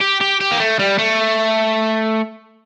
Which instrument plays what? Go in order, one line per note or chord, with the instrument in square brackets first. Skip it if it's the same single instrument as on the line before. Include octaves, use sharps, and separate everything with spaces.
[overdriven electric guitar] G4
G4
G4
A#3
A3
G3
A3